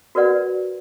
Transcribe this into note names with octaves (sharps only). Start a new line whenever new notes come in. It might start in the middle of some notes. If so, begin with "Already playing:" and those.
F#4 A#4 B4 D5 F#5